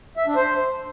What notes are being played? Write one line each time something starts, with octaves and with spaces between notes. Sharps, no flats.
E5
D4
C5